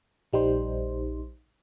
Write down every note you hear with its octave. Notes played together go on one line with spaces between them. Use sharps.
A#1 G3 D#4 C5